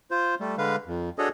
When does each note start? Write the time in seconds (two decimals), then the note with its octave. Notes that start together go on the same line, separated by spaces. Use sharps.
0.11 F4 C5
0.40 G3 A3
0.58 D3 G#3 B4 F5
0.87 F2
1.18 D4 F#4 G#4 A4 C#5 D#5